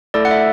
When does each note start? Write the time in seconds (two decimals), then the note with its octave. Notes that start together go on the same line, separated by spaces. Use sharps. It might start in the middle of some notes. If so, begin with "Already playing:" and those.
0.14 A3 E4 A4 D5
0.25 F#5
0.31 E5